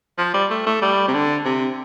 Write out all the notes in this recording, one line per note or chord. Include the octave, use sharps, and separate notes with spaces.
F3
G3
A3
A3
G3
C3
D3
C3